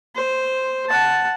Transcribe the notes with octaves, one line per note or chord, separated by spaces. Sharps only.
C5
F#5 A5